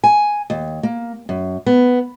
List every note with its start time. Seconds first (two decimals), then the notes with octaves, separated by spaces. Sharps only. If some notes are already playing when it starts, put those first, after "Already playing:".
0.04 G#5
0.50 D#2
0.83 A#3
1.29 F#2
1.66 B3